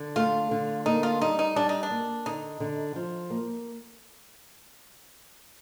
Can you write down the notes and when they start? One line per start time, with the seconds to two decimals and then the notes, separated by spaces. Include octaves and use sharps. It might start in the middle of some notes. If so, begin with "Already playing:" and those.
Already playing: D3
0.16 A3 F4
0.51 D3
0.86 A#3 D#4
1.03 F4
1.21 G3 D#4
1.39 D#4
1.56 G3 D4
1.69 D#4
1.83 D4
1.91 A#3
2.26 D3 D#4
2.60 D3
2.96 F3
3.30 A#3